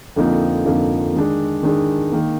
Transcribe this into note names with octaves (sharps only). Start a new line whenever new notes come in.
F2 D3 F3 A#3 D#4
F2 D3 F3 A#3 D#4
D#3 G#3 D4
D#3 G#3 D4
D#3 A#3